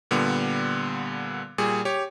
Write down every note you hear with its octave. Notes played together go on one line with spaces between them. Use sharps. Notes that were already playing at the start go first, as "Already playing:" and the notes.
A#2 D3 G3 B3
A#2 G3 G#4
G4 C#5